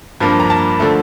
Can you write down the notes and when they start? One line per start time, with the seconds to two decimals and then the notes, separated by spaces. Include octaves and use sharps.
0.20 G2 F3 A#3
0.40 A#5
0.50 A5
0.80 D3 F3 A3